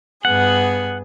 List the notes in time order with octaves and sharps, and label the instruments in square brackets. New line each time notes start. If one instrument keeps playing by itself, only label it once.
[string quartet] G2 B3 G#4 [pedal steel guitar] F#5